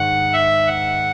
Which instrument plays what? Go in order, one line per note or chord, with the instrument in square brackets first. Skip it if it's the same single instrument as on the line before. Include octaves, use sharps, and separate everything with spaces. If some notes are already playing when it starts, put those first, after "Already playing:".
Already playing: [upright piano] G#2 D#3 [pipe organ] F#5
[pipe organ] E5
F#5